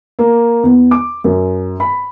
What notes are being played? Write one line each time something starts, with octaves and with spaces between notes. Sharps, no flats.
A#3
E2
D6
F#2
B5